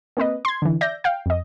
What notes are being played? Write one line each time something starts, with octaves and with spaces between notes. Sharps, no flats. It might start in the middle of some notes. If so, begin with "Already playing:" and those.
A#3 C4 B4 D#5
C6 G#6
D3 E3
D5 E5 G6 A#6
F5 G5
F2 D#5